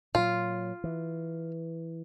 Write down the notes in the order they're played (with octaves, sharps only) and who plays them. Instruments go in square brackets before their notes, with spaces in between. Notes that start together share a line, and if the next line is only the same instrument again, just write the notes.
[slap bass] A#2 F#3 [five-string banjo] F4
[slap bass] E3